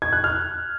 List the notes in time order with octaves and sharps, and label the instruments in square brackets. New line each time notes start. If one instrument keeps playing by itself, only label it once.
[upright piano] G#6
F#6
F6